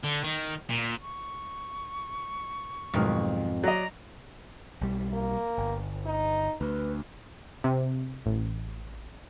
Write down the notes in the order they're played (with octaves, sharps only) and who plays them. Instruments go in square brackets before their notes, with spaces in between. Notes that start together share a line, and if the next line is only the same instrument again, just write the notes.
[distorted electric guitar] D3
D#3
A#2
[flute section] C#6
[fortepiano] B1 D#3 F6 [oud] F2 G#2
[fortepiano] F#3 D#5 [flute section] D5 A#5
[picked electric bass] B1 G3
[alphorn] A#3
[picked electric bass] G1
[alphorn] D#4
[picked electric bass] D2 [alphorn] B4
[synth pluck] C3
A1